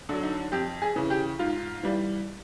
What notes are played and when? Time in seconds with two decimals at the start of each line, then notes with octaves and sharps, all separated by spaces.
0.09 D3 F#3
0.23 D#4
0.52 F2 G4
0.82 G#4
0.96 C#3 E3
1.10 G4
1.39 G#2 F4
1.83 E3 G3